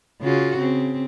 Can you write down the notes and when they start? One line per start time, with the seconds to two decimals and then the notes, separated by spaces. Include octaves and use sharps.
0.22 C#3 F4 F#4
0.57 C#3 C4